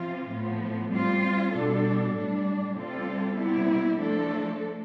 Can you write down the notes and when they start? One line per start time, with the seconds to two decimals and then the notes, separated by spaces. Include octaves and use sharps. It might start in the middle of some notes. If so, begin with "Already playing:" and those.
Already playing: C3 F3 C4 F4
0.29 A2 F3 B3
0.91 G3 C4 F4
1.52 B2 G3 D4 A4
2.14 A2 G3 D4
2.76 C3 G3 C4 F4 A4
3.37 C3 G3 B3 E4
3.99 F3 A3 D4 A4